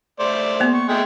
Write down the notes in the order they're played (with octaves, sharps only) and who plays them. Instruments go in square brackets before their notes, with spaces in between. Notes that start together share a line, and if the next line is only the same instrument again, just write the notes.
[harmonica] A3 C5 D5
[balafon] A#3 B3
[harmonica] C#6
G#3 A3 G5